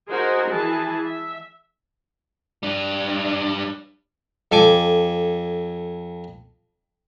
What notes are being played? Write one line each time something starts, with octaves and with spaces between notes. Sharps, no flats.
D#4 F#4 G#4 A#4 C5
E3 G#4 A5
E5
G3 D4
F2 A4 G#5 D6